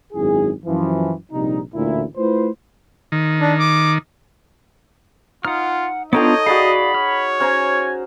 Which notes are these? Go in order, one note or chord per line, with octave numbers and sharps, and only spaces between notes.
G#1 F#2 E4 G#4
F#2 E3 F3
A#1 C3 G3 D#4
A1 D2 A#2 E4
A3 E4 F4 B4 C5
D#3
D4
D6
D#4 F4 F#5 F6
B3 D4 D#4 F4 A4 C#5 D#5 G5
F#4 G#4 D5 F5 B5
C#5 F6
C#4 C5 G#5 A#5